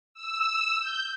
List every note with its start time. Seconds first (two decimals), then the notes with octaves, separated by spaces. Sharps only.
0.14 E6
0.79 G6